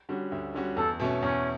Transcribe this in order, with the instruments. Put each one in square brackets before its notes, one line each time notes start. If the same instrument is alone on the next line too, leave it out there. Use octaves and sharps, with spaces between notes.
[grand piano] D3 G3 C#4 F#4
D2
D3 G3 C#4 F#4
[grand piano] E2 [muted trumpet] A4
[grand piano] B2 A3 C#4
[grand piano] E2 [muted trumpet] C#4